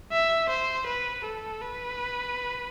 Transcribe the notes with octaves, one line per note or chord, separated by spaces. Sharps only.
E5
C5
B4
A4
B4